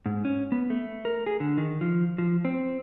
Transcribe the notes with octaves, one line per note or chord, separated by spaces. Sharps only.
G#2
C#4
B3
A3
A#4
G#4
D3
D#3
F3
F3
C4